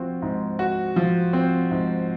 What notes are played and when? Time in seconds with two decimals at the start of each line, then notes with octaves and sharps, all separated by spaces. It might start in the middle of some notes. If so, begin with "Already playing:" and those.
Already playing: F3 C4 F#4
0.22 G#2
0.59 F#4
0.96 F3
1.33 C4
1.71 G#2